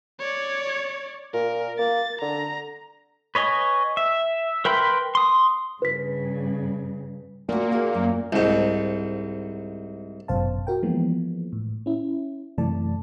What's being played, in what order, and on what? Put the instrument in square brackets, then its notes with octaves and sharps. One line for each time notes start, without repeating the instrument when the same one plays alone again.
[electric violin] C#5 D5
[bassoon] A#2 [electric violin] A#4
[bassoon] A#3 [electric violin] A6
[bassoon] D3 [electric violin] A#5
[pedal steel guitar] B4 C#5 D#5 G#5
E5
A#4 B4 G5 B5 C6
C6 D#6
[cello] G2 C#3 [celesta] B4 B6
[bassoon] A#2 [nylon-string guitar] A3 F#4 [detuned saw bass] A#3
[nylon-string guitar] E4 F#4 G#4
F#2
[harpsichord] C2 G#2
[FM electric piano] G1 F#2 B2 C5 F5 A5
F#4 A#4 G5
E3 F3 G#3 A#3 B3
A2
C#4 E4
F#2 C3 E3 A3 D5 A5